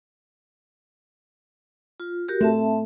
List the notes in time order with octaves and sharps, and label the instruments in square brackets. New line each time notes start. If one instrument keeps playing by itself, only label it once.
[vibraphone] F4
F#4 G4 A#4
[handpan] A3 [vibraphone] C4 E5 A5